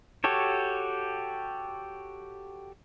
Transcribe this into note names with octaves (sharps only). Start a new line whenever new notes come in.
F#4 G4 A4 C#5